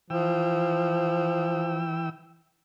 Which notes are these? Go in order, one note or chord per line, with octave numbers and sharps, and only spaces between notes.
E3 F3 G5 E6